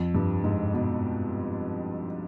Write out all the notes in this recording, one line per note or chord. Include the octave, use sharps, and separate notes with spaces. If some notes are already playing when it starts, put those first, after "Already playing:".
Already playing: F2
G2
G#2
B2